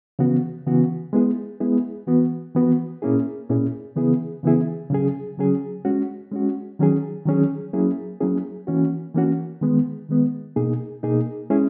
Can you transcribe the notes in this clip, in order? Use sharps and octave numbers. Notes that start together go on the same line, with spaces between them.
C#3 E3 B3 F#4
C#3 E3 B3 F#4
G#3 B3 E4 G#4
G#3 B3 E4 G#4
E3 B3 F#4
E3 B3 F#4
A#2 A#3 C#4 E4 G#4
A#2 A#3 C#4 E4 G#4
C#3 E3 B3 E4 G#4
C#3 E3 B3 E4 G#4
C#3 F#3 C#4 G#4
C#3 F#3 C#4 G#4
G#3 C#4 F#4
G#3 C#4 F#4
D#3 F#3 C#4 G#4
D#3 F#3 C#4 G#4
F#3 A#3 C#4 E4 G#4
F#3 A#3 C#4 E4 G#4
E3 A#3 C#4 F#4
E3 A#3 C#4 F#4
D#3 G#3 B3
D#3 G#3 B3
B2 A#3 D#4 G#4
B2 A#3 D#4 G#4
G#3 C#4 E4 G#4